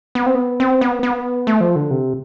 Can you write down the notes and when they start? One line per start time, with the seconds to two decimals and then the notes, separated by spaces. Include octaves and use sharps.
0.15 B3
0.26 C4
0.35 B3
0.60 C4
0.81 B3
1.03 B3
1.47 A3
1.61 F3
1.76 D3
1.91 C3